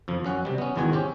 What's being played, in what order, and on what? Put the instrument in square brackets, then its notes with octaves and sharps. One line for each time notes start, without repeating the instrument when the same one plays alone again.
[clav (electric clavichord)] F2 F3
F#2 C#4 F#5
C3 G3
B3 C#4
G#1 E2 D#3 G#3 F#4 G#5
C4 C#4 G4